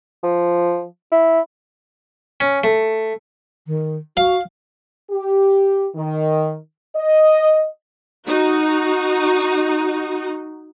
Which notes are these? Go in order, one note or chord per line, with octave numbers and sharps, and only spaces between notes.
F3
E4
C#4
A3
D#3
F#4 F5
G4
D#3
D#5
D#4 F#4